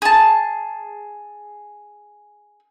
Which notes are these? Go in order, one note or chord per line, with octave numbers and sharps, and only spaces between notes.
G#4 A5